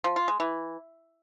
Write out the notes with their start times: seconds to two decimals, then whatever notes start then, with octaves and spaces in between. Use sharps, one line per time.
0.04 F3
0.16 F4
0.28 G#3
0.40 E3